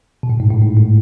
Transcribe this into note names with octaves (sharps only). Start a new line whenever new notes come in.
B2
A2
G#2
A2
G#2
A2